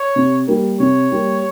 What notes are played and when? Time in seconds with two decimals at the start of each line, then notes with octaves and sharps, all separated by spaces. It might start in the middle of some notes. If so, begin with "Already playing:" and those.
Already playing: C#5
0.16 C3
0.47 G3 A#3
0.79 C3 C#5
1.12 G3 A#3